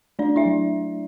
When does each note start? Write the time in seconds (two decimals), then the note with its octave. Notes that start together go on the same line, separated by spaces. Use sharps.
0.19 A3 D4 D5
0.36 E4 E5
0.46 F#3